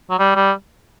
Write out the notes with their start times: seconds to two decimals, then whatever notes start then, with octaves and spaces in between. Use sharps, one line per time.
0.10 F#3
0.19 G3
0.36 G3